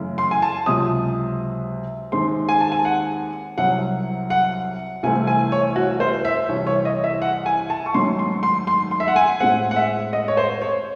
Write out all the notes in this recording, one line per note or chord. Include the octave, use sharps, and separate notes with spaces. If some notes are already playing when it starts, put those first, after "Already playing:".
Already playing: F#2 C#3 E3 A3
C6
G#5
A5
C#2 C3 F#3 C4 D#6
D#2 D#3 G#3 C4 C6
G#5
A5
G#5
F#5
C2 C3 F#3 F#5
F#5
C2 C3 E3 A3 C4 G#5
G#5
C#5
F#4
C5
E5
C2 C3 E3 C#5
C#5
D#5
E5
F#5
G#5
A5
C#6
G#2 D#3 F#3 A3 C6
C6
C6
C6
C6
E5
F#5
G#5
A2 G#3 C4 F#5
F#5
E5
D#5
C#5
C5
C#5